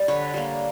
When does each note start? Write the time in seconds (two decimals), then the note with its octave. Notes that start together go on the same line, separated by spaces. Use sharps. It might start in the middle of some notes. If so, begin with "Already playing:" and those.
Already playing: G3
0.08 D3 B4 C#5
0.34 G3 A#3